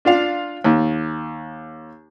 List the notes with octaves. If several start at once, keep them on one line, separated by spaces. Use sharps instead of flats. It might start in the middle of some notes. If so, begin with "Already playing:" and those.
D4 F4 F5
D#2